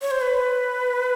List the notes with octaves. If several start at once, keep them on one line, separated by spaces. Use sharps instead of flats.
C#5
C5
B4